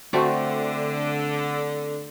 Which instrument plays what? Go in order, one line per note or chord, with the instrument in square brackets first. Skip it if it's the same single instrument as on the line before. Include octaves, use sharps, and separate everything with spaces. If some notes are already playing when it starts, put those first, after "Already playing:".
[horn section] D3 [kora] A3 C4 F#4